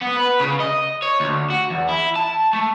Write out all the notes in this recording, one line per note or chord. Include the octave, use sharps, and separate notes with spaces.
B3
B4
C#3
D#5
C#5
D2
F#4
E2
E4
A5
A3